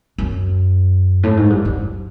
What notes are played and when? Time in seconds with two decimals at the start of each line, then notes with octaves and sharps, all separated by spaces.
0.18 F#2
1.23 A2
1.37 G#2
1.50 G2
1.65 F#2